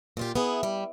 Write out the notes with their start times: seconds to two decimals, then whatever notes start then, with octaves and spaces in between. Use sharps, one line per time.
0.17 A#2 F4 G4
0.36 B3 E4 G#4
0.63 G3